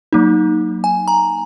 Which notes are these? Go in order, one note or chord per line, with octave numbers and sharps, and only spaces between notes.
F#3 A#3 D#4
G#5
A#5